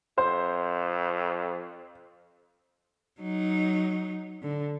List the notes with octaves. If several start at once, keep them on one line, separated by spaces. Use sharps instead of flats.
F2 C5
F#3 D#4
D3